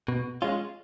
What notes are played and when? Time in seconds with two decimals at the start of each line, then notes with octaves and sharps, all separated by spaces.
0.08 B2
0.42 G#3 C#4 F4